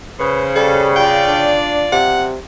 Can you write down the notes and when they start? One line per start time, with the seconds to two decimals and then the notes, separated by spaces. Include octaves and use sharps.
0.20 C#3 B4 C5
0.56 G3 A4
0.96 F4 D5 G5
1.28 D4
1.92 C3 F#5